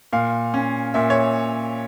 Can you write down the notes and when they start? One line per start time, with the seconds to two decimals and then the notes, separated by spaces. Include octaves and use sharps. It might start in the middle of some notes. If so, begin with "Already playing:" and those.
0.13 A#2 F5
0.54 C#4
0.94 A#2 E5
1.10 C#5